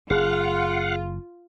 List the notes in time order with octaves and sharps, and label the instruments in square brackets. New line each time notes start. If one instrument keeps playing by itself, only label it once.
[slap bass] F#1 [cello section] F4 [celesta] G#4 [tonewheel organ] F5 F#5